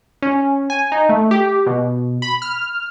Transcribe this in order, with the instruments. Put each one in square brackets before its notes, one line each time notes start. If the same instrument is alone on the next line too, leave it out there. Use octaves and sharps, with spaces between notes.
[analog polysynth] C#4
G#5
D#4
A3
G4
B2
B5
F6